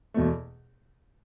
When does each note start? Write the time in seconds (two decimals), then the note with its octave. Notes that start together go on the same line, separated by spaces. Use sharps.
0.14 E2 B2 A3